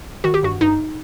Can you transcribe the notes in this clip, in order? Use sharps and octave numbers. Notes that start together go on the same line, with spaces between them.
D#3 F#4
G4
G2 F#4
G2 D#4